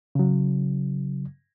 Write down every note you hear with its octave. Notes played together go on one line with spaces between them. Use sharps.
C#3 F#3